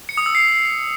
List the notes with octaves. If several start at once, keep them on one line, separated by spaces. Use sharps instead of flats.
C#7
D#6
E6
C7